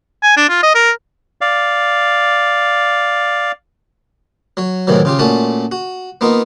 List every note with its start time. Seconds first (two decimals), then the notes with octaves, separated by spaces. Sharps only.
0.23 G#5
0.37 D4
0.49 F4
0.63 D#5
0.75 A#4
1.41 D5 F5
4.57 F#3 C#5
4.87 A2 C3 D#3 E3 F#3
5.05 C#3 F4 G4
5.19 A#2 A3 C#4 F#4 A5 D#6
5.72 F#4
6.21 A#3 B3 D#4 F4